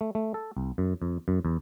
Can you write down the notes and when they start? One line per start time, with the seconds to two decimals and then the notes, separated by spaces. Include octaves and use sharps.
0.01 A3
0.15 A3
0.34 A4
0.57 C2
0.78 F#2
1.02 F2
1.28 F#2
1.45 E2